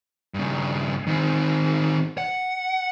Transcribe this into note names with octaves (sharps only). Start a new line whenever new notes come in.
G2 C#3
D#3 C4
F#5